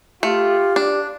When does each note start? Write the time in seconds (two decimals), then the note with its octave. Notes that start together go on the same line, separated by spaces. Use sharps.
0.23 A3 F4 G4
0.76 D4 D5